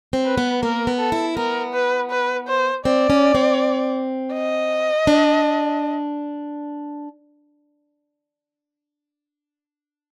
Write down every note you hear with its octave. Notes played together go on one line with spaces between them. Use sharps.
C4
B4
B3
A#3 A#4
B3
A4
E4
B3 A#4
B4
B4
C5
C4 D5
C#4
C4
D#5
D4